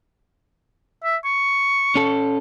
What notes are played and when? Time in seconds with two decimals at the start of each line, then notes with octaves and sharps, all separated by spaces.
1.04 E5
1.25 C#6
1.96 C#4 A4